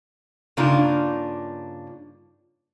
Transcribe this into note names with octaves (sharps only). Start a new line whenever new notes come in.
G2 C#3 A#3 D4 D#4 F4